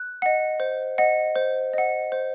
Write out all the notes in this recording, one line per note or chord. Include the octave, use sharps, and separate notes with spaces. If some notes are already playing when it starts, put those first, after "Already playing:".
Already playing: F#6
D#5 F#5
C5
D#5 F#5
C5
D#5 F#5
C5